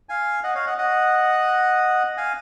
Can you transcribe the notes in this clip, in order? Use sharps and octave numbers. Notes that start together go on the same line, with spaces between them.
F5 G#5
D#5 F#5
C#5 F5
D#5 F#5
D#5 F#5
F5 G#5